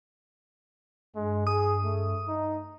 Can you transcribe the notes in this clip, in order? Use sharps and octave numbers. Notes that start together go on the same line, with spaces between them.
G2 G#3
G#4 D#6
A3
D#4